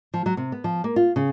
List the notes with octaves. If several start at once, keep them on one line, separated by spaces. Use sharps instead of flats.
F3
F#3
C3
B3
F3
A#3
F4
C#3